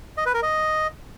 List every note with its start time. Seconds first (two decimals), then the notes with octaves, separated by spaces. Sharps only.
0.17 D#5
0.26 B4
0.34 A#4
0.42 D#5